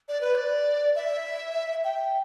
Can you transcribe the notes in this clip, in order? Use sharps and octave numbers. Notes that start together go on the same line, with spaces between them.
D5
B4
D5
E5
G5